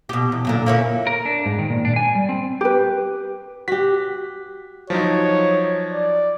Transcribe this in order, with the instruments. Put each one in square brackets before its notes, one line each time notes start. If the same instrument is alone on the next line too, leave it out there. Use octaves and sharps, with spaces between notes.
[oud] B2 G4
E2
F#2 A#2 D3
A#3 C#4 E4
[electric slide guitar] A#4
D4
G#2
D#3
A#2
D4
G#5
G3
C4
[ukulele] G4 B4
[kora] F#4 G4 [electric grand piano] B6
[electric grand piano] F3 F#3 D#4 [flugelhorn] C#5
[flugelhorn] D5